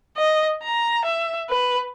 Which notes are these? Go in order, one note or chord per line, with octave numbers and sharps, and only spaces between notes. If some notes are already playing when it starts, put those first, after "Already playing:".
D#5
A#5
E5
B4